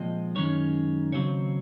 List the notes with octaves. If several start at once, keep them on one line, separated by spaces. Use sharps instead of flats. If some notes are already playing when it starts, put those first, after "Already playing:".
Already playing: A#2 F3 G#3 C4 D#5
F#2 D#3 G#3 C#4 C#5
D#2 C#3 F#3 C4 C#5